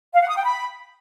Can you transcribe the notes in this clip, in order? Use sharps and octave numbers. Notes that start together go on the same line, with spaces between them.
F5
F#5
D#6
G5
B5